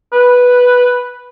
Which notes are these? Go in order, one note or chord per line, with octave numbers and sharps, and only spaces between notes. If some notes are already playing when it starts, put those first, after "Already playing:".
B4